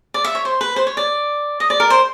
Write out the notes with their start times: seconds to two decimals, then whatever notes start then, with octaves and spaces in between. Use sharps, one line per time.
0.14 D5
0.24 E5
0.35 C#5
0.45 C5
0.61 B4
0.76 C5
0.87 C#5
0.97 D5
1.60 D#5
1.70 D5
1.80 A#4
1.90 C5